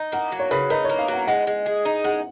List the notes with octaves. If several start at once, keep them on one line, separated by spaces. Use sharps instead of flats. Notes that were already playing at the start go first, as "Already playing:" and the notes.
Already playing: D#4
A#3 F#5
F#3
C#5
C#3 B4
D#4 B4
C#5
A#3
F5
F#3 F#5
G#3 F#5
G#3
G#4
D#4
G#3 F#5